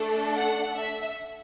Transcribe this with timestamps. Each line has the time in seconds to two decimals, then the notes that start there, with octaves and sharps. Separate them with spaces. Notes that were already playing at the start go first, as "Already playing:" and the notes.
Already playing: A3 D4 A4
0.34 F#5
0.76 E5